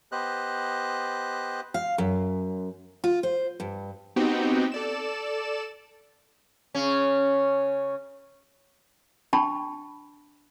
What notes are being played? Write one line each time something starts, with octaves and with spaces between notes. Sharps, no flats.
B3 G4 C5 D#5 F#6
F5
F#2
F4
C5
G2
B3 C4 D#4 F#4 G4 G5
A4 D5 E7
C#3 C#4
D4 G5 A5 B5 C#6